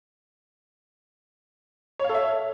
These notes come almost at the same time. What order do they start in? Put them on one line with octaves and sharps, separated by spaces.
C#5 F5 A4 E5